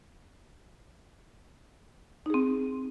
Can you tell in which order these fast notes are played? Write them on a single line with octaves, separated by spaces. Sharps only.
D#4 G#4 C4